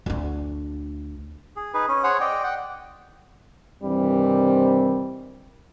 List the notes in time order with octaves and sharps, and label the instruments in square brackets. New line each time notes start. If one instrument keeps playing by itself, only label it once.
[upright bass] D2 D4
[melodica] G#4
D#4 G#4 B4
C#4
G#4 C5 C#5 F#5
D5 D#5 G5
F#5 G5
[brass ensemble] G2 C3 D#3 E3 G3 C4